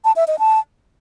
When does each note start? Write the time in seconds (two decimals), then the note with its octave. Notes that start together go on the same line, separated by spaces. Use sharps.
0.05 A5
0.16 E5
0.28 D#5
0.39 A5